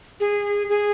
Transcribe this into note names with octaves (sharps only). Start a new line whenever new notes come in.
G#4
G#4